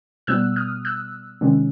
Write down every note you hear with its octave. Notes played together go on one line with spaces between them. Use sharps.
B2 G3 B3 E6 F#6
D#6 F6
E6 F#6
C3 D#3 G#3 C#4